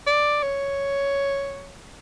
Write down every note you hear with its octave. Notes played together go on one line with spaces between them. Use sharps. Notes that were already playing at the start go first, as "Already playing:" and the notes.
D5
C#5